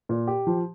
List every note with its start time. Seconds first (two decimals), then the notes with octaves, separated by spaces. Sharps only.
0.09 A#2
0.27 G4
0.47 F3